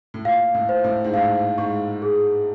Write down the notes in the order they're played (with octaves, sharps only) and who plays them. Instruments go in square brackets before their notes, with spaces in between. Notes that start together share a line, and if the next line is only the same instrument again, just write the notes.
[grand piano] A2
[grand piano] A#2 [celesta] F5
[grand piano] A2
[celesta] C5
[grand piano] A2
G#2
[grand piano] A2 [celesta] F5
[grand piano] G#2 [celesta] C#6
[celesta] G#4